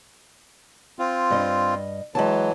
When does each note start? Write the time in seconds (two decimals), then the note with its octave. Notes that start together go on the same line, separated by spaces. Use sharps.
0.99 C4 F4
1.30 G2 D#5
2.15 E3 F#3 G#3 A5